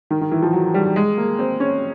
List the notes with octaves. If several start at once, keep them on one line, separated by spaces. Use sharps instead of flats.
D#3
D#3
E3
F3
F#3
G3
G#3
A#3
C4
C#4